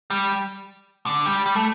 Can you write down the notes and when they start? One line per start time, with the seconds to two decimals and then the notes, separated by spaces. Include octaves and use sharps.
0.10 G3
1.06 D3
1.26 G3
1.46 G3
1.56 A3